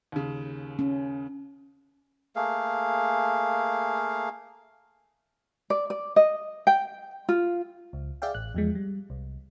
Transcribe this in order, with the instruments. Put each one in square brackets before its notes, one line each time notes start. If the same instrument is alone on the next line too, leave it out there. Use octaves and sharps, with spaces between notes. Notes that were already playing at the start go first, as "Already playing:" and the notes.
[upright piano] D#2 C#3
[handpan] C#4
[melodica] A3 A#3 G#4 F5
[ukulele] D5
D5
D#5
G5
F4
[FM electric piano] C#2
G#4 D5 E5 F5 G5
A1 F#6
E2 F3 G#3
G3
C2